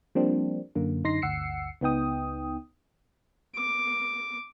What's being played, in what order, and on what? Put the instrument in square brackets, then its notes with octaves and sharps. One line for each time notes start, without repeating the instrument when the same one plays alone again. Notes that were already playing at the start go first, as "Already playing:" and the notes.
[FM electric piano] F3 G3 A#3 C4 D4
F#2 D3 A#3
F#2 D3 D#4 C6 A#6 C7
G1 D2 F#5 E6 C7 C#7
C#2 B3 D#4 G5 D#6
[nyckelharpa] D6